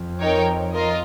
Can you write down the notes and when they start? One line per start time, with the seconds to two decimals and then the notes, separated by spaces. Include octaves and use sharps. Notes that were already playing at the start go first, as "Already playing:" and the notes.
Already playing: F2
0.20 D#4 A#4 C#5 G5
0.73 F4 A#4 D#5